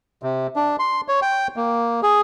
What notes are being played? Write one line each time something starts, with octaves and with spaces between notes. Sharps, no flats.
C3
D4
C6
C#5
G5
A#3
G#4